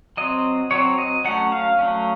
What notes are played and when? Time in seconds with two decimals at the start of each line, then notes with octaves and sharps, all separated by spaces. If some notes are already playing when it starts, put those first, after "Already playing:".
0.17 F#3 C4 D#5
0.71 F#3 C4 C#5
0.98 D#5
1.25 F#3 A3 C#4 F#5
1.52 F5
1.79 F#3 A3 C#4